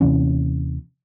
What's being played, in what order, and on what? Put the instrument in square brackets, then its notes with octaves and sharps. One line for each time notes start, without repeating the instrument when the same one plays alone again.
[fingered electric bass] D#2 C3 E3 C#4